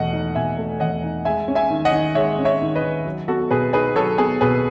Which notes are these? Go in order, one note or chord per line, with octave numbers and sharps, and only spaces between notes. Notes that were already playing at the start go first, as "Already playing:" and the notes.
Already playing: E2 B2 A3 D#5 F#5
D#4
B2 E5 G#5
A3
E2 D#5 F#5
D#4
G#3 E5 G#5
C#4
E5 G#5
D#3
D#5 F#5
D#3
G#3 C#5 E5
C#4
C#5 E5
D#3
B4 D#5
D#3
F#3
B3 F#4 A4
B2 G#4 B4
D#4 G#4 B4
F#3 A4 C#5
B3 G#4
B2 G#4 B4